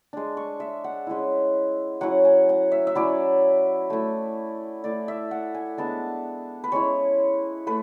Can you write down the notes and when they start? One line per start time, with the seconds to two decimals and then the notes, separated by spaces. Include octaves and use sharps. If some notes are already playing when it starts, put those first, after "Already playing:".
0.13 G#3 D4
0.37 C#6
0.60 E5
0.84 F#5
1.07 G#3 C#4 E4
2.01 F#3 C#4 E4 F#5
2.25 G#5
2.49 F#5
2.72 E5
2.87 E5
2.95 F#3 C#4 E4 D5
3.90 A3 E4
4.84 A3 E4 D5
5.08 E5
5.31 F#5
5.54 G#5
5.78 G#3 B3 D4 A5
6.64 B4
6.72 G#3 C#4 E4 C#5
7.67 A3 B4